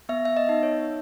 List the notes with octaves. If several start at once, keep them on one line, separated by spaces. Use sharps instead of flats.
B3 E5
E5
D#5
D#4
C#5